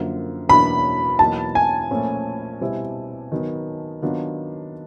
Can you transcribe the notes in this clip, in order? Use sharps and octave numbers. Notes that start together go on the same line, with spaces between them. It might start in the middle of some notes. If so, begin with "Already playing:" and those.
Already playing: F#2 D3 F3 A#3
E2 B2 F#3 A#3 D4 B5
E2 B2 F#3 A#3 D#4 A5
G#5
A#2 F3 A3 C#4
B2 G3 C4 E4
D#3 F#3 B3 D#4
D#3 F#3 B3 D4 F4